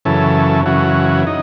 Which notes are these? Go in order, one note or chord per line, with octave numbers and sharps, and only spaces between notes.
F#2 C#3 E3 A4
F#2 C#3 E3 F#4
D#4